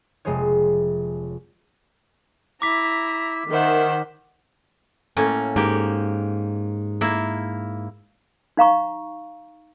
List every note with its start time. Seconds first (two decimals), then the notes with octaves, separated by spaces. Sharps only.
0.25 F1 G#3 G#4 C5 C#5
2.62 E4 A#5 D6 B6
3.50 D#3 C5 E5 F#5 E6
5.17 A2 A#3 C#4
5.56 G#2 A#3 G4
7.01 A#3 E4
8.57 D#4 F5 A#5 C#6